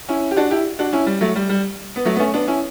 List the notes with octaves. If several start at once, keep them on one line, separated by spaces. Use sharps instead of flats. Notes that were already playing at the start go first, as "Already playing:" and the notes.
C#4 E4
G4
D4 F#4
E4 G4
D4 F#4
C#4 E4
G3
F#3 A3
G3
G3
B3
F#3 A3
B3
A3 C#4
B3 D4
C#4 E4